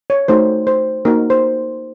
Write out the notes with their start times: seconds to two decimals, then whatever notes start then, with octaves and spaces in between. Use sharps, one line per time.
0.10 C#5
0.28 A3 D#4 F#4 C5
0.67 C5
1.05 A#3 D#4 F#4 A#4
1.30 C5